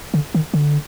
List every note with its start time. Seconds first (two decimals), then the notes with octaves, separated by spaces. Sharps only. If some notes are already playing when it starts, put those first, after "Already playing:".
0.14 D3
0.34 D#3
0.54 D3